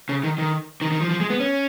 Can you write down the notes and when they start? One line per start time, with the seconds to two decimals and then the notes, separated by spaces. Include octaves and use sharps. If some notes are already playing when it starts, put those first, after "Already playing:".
0.09 C#3
0.23 D#3
0.38 D#3
0.81 D#3
0.92 D#3
1.01 F3
1.11 F3
1.21 G#3
1.30 B3
1.40 C#4